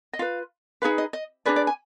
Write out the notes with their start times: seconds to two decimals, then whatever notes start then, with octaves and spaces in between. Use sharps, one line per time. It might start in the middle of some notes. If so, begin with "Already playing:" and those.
0.13 D#5
0.19 F4 B4 F5
0.82 D#4 G#4 B4 F5
0.98 D#5
1.13 D#5
1.45 D4 G#4 B4 D5
1.56 D5
1.67 G#5